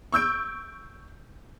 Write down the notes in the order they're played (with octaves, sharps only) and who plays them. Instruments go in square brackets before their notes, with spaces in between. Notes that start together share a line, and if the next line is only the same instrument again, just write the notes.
[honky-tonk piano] C#6 E6 G6 D7